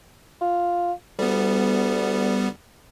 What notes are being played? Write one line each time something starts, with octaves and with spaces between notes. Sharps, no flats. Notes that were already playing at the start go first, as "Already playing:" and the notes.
F4
D2 G3 B3